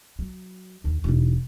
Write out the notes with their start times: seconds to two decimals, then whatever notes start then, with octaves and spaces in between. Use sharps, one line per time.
0.19 F#3
0.84 D#2
1.04 E1 D#4